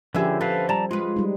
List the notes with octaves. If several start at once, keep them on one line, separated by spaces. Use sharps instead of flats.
D3 F3 C#4 G4 G#4 B4 E5
D3 C4 A4 B4 F5
G3 D5 A5 A#5
G#3 F4 B4
G3 D#4